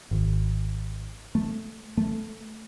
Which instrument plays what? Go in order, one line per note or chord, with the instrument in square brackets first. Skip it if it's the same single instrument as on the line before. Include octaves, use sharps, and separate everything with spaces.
[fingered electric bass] G#1
A3
A3